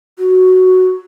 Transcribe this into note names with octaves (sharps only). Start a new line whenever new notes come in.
F#4